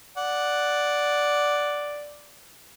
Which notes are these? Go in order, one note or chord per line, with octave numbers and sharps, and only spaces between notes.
D5 F#5